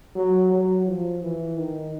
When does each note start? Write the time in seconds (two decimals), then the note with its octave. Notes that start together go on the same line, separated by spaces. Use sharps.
0.15 F#3
0.51 F#3
0.87 F3
1.23 E3
1.58 D#3